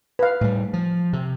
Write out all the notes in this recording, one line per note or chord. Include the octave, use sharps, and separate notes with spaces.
B4 F5
A2 G3
F3
C3